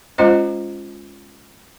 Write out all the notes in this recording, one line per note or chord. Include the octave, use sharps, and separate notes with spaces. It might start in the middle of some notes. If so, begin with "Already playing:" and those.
G#3 C#4 F4 C5 D#5